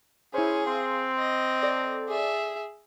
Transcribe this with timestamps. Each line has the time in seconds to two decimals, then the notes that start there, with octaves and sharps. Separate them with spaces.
0.34 C#4 E4 G#4 C5
0.66 C4 F5 C6
1.19 D#5
1.63 A4 D5
2.08 G#4 E5